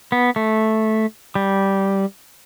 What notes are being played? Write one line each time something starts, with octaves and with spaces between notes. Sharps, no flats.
B3
A3
G3